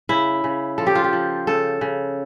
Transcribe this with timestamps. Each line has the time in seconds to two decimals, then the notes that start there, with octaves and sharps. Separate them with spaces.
0.09 C#3 E4
0.44 C#3
0.78 F3 A4
0.87 G4
0.95 F4
1.04 G4
1.13 F3
1.47 C#3 A4
1.81 C#3